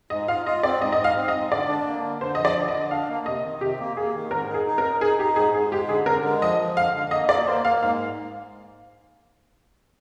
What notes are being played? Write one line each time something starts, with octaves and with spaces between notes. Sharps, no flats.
G#2 D#5
F4 F5
F4 D#5
C4 D5
G#2 D#5
D#5
G#2
F5
C4
D#5
G#2
D3 D5
D4
A#3
D3
D3 C5
F3 D#5
D5
D3
D#5
D3
D4 F5
A#3
C3 D#5
D#3
C3 G4
A#3
A#3 G#4
D#3
G#2 A#4
D#4
G#4
D#4
A#4
D#4
D#4 G#4
D#4 G4
G#2 G#4
G#2 G#4
G#3 G4
D3 G#4
D3 A#4
G#3
F3 D#5
F3
D3 F5
D3
A#3 D#5
A#3 D5
A#3 C5
A#3 F5
G#2 F5